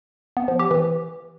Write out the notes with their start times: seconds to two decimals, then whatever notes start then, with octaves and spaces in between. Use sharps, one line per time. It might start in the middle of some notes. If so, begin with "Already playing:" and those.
0.37 B3
0.48 F3
0.59 G4
0.71 E3